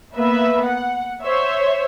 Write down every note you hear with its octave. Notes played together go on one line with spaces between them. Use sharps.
A#3 B3 B4 E5
F#5
C5 C#5 E5